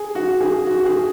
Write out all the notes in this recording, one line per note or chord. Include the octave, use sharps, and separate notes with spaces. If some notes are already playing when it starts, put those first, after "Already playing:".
Already playing: G#4
F#4
G#4
F#4
G#4